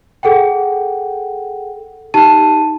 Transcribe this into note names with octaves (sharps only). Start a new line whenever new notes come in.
G#4 A4 F#5 G5
D#4 G4 A5 D#7